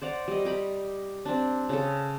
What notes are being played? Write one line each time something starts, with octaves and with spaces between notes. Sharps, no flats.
C5 D5 F#5 A#5
G3 D#5
G4 A#5 B5
C4 D4
C#3 A4